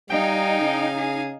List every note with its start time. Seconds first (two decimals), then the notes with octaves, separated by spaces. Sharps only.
0.10 G3 D#4 F5 G5 G#5
0.60 C#3
0.97 G#4